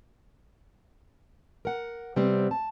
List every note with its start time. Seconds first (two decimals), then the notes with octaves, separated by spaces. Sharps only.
1.65 A#4 F#5
2.16 C3 G3 B3 C4
2.51 A5